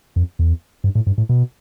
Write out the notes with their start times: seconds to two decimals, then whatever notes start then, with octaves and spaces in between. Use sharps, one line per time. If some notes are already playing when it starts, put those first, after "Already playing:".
0.16 F2
0.39 E2
0.84 G2
0.95 A2
1.07 G2
1.18 A2
1.29 B2